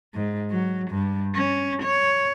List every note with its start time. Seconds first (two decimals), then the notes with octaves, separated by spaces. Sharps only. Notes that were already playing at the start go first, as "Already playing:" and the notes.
0.15 G#2
0.51 F#3
0.91 G2
1.35 C#4
1.83 C#5